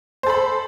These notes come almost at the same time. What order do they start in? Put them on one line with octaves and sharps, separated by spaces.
C5 A4 B5